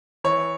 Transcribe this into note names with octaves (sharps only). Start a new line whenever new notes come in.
E3 C#5